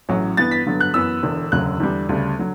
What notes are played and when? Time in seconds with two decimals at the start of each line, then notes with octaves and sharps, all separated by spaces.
0.09 A1 A2 F#3 C#4
0.37 G2 E3 B3 A6
0.51 B6
0.66 G2 D3 F#3 B3
0.80 F#6
0.94 F#2 E3 B3 E6
1.23 E1 E2 D3
1.52 E1 D2 C#3 F#3 F#6
1.80 E2 D3 G3
2.09 D2 C#3 G3 D4
2.39 D3 F#3